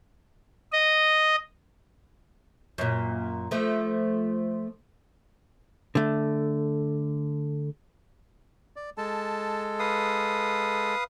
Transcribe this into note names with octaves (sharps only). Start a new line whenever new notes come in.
D#5
F#2 A#2
F3 A3
D3 A3
D5
G#3 A4 A5
B4 F5 D#6